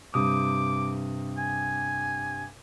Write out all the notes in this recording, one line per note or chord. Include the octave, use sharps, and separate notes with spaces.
G2 C3 D6 D#6
G#5